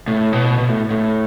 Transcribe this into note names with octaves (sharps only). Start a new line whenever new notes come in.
A2
B2
B2
A2
A2